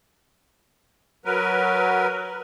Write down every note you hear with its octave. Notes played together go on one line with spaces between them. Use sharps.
F#3 A#4 B4